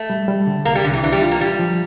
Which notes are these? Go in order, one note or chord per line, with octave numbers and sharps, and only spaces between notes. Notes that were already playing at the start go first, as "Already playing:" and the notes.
Already playing: A3
G3
G3
D3
C2 A#3
G3
C2 D3
E3
E3 D4
G3
F4
A#3
G3 F4
F3